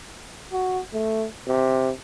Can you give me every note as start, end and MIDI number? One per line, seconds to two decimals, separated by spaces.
0.52 0.80 66
0.93 1.26 57
1.47 1.91 48